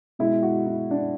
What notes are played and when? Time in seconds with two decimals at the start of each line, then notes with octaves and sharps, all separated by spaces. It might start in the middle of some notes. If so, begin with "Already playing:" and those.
0.19 B2 G#3 E4
0.43 F#4
0.67 E4
0.91 D4